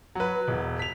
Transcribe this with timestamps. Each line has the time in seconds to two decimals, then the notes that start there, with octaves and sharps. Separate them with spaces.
0.15 F#3 B4
0.48 E1
0.79 B6 F7